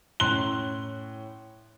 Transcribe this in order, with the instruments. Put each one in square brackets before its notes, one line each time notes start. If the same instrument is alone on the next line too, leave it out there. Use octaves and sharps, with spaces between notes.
[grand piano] A2 C#4 C6 F#6 G7